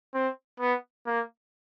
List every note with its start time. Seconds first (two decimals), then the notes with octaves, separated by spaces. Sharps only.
0.14 C4
0.60 B3
1.06 A#3